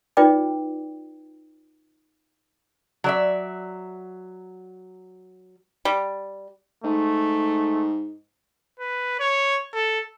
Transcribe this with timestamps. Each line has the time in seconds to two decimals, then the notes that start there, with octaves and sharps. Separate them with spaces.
0.17 D#4 F4 B4 D5 G5 D6
3.04 F#3 D5 E5
5.85 G3
6.84 G#2 A3
8.79 B4
9.20 C#5
9.74 A4